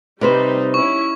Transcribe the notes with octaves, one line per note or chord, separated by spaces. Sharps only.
C3 G3 D#4 B4 C5
C#4 E4 C#6